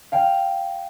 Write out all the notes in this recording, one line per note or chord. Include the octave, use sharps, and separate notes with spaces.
F5 G5